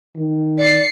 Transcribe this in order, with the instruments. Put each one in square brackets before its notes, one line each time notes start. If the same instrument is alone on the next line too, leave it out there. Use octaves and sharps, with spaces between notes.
[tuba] D#3
[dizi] D5 [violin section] C7 C#7